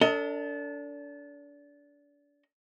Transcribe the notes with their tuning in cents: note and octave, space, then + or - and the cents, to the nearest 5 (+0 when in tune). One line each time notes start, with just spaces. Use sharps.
D4 -30 A4 +40 D#5 +25